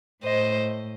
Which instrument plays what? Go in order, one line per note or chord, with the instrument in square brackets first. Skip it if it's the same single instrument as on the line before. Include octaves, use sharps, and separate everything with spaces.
[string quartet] A2 C5 D#5